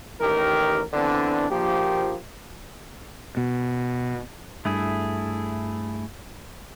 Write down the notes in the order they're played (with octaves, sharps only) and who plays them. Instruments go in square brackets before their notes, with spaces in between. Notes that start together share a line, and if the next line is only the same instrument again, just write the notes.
[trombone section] A1 D#3 G4 A#4
D3 E3 B3 C4 D4
A#1 F3 A#3 G4
[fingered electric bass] B2
[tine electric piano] G2 [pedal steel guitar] A3 E4 G#4